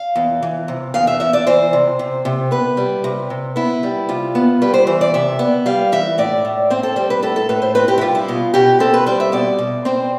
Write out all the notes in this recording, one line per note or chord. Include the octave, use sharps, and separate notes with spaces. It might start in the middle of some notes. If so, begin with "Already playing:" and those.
Already playing: F5
E2
E3
C3
E2 F5
E5
E2 E5
D5
E3 C5
C3
C3
C3
B3 B4
G3
C3
C3
B3 E4
G3
C3 F4
B3
G3 B4
C5
E3 C5
D5
C3 E5
B3
G3 F5
E3 E5
A2 D5
A2
C4 C5
A4
G3 C5
B4
A2 A4
A4
A2 B4
C5
C4 B4
G4
E4
G3 F4
E4
B2 F4
B2 G4
C4 A4
B4
G3 C5
E5
B2 D5
B2
C4 C5